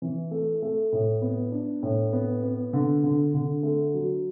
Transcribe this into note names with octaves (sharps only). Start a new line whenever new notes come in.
E3
A3
A3
A2
B3
D4
A2
B3
B3
D3
D3
D3
A3
F#3